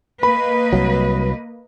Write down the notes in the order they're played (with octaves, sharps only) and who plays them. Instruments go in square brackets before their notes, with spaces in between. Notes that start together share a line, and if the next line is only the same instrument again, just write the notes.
[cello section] A#3 B4 D#5 [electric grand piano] B5
[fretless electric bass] C2 F#3